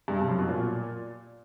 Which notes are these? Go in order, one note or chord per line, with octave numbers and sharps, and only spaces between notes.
G2
C3
F#2
B2
A#2